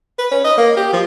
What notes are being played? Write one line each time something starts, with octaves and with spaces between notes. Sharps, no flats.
B4
C#4
D#5
A#3
G4
F3